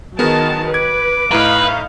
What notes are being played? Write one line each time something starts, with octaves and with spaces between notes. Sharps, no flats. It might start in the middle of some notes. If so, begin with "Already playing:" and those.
D#3 F#3 B3 G#4 A#4 A5
B4 D6 G#6
A2 D#4 E4 B4 F5 A#5